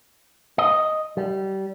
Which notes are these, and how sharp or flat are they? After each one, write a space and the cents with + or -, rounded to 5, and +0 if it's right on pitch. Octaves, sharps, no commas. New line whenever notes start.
D#5 +0
G3 -25